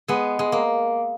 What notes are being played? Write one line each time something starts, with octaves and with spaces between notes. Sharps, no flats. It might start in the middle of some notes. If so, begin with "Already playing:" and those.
G#3 B3
G#3
A#3